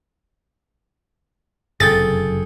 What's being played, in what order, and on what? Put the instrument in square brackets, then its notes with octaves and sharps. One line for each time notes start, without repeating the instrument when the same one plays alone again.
[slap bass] F#1 F2 C3 [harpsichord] G#4 A4 G5 [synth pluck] A6